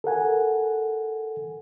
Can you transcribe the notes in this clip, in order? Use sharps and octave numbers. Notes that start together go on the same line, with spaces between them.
A4 A#4 F#5 G#5